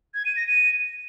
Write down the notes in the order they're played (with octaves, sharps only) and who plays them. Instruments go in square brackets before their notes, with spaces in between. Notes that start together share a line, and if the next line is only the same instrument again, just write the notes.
[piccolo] G#6
D#7
A#6
D#7